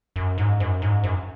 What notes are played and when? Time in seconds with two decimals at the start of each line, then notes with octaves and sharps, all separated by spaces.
0.16 F#2
0.38 G#2
0.60 F#2
0.82 G#2
1.04 F#2